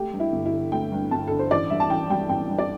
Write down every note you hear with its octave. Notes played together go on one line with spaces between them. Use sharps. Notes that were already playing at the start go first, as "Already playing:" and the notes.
Already playing: A3 G4
G2
E4
G1
E4
D3
A3 G5
G2
G1 A5
D3 A4
C5
A1 D5
G2 E5
A5
A1 G5
G3 G5
A1 G5
G2
D5